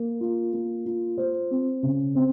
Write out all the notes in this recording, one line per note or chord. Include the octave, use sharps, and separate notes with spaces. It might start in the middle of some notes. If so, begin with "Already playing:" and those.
Already playing: A#3
F4
A#3
F4
C5
C4
C#3
C4